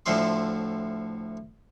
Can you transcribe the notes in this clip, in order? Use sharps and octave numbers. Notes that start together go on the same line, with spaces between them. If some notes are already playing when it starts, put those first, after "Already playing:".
D2 A2 D3 F3 A3 C6